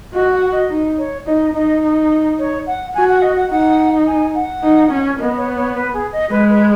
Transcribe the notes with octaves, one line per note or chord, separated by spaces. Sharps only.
F#4 D#5
F#5
D#5
D#4
C#5
D#4 D#5
D#4 D#5
C#5
F#5
F#4 G#5
F#5
D#5
F#5
D#4 F#5
G#5
F#5
D#4
C#4
B3 D#5
C#5
C#5
B4
G#4
D#5
G#3 B4
B4